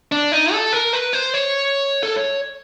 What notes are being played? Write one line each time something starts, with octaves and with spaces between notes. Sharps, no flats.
D4
D#4
A4
A#4
B4
C5
C#5
A4